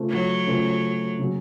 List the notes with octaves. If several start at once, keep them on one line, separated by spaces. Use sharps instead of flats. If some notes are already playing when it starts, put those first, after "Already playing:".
Already playing: C#3 A3 C#4 F4 C5
F#3
C#3 A3 C#4 F4 C5
C#3 F#3 A#3 C#4